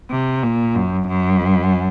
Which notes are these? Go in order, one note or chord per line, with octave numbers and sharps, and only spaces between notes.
C3
A#2
F#2
F#2